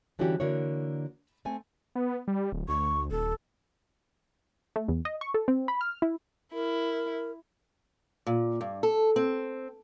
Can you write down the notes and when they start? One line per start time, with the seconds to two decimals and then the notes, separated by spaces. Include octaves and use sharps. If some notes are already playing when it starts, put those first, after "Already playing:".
0.19 D3 E3 G3 C#4 F#4 G4
0.40 D3 A#3 E4 F#4 C#5
1.45 A3 C4 G#5
1.95 B3
2.28 G3
2.52 D1
2.68 D2 C#6
3.11 D#1 A4
4.76 A3
4.88 E2
5.05 D#5
5.21 C#6
5.34 A4
5.48 C4
5.68 B5
5.81 F6
6.02 E4
6.53 E4 A#4
8.27 A#2
8.61 G2
8.83 A4
9.16 C4